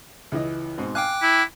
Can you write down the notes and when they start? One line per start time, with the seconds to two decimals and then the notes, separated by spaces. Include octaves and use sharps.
0.32 C#2 E3 D#5
0.78 G#2 B2 C4
0.95 F5 G5 G#5 D6 F#6
1.22 E4